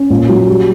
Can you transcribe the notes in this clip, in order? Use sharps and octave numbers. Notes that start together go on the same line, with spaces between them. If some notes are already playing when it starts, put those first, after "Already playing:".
Already playing: C#4
A#2
F#3
G3